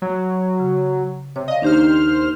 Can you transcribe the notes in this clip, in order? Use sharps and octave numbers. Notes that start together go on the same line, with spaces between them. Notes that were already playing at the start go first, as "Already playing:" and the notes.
F#3
C#3
C3 C#5
D5 D#5 F5
D#2 D4 D#4 G4 C5 F6